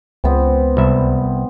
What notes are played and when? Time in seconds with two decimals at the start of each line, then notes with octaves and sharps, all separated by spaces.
0.24 C#2 B3 C4
0.77 C2 E5